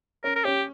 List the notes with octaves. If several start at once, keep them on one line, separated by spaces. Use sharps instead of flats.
C#4 A#4
A#4
C#4 G4